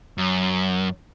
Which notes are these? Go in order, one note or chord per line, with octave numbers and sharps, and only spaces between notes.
F#2